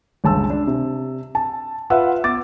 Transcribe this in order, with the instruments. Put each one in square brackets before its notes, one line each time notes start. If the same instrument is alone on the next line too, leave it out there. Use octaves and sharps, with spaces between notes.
[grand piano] G1 C#2 A5 E6
D4
C3
A5
F4 B4 E5 F#5 E6
B3 D6 A6